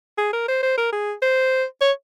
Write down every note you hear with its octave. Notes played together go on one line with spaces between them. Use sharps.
G#4
A#4
C5
C5
A#4
G#4
C5
C#5